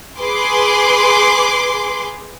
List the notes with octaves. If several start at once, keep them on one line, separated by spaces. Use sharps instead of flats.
G#4 B4 C6 D6